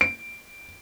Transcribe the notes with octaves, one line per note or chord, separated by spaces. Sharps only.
D7